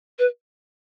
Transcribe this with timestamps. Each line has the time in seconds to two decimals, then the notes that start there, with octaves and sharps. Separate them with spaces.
0.19 B4